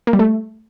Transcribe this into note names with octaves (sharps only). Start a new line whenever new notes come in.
A#3
G3
A3